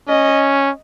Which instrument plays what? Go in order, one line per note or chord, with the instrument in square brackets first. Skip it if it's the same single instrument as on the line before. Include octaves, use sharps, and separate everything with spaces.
[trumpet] C#4 [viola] D#5